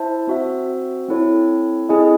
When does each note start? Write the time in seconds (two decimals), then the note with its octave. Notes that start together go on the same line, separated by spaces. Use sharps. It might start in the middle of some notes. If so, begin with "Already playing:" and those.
Already playing: E4 C5 E5 A5
0.27 C4 F#4 C5 E5
1.08 C4 E4 A4 C#5
1.89 C4 E4 G#4 D#5 G#5